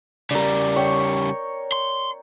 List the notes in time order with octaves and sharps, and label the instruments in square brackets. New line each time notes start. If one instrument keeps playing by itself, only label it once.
[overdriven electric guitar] C#3 G3 [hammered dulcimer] A#4 D5
[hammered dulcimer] C#5 G5
[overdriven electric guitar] C6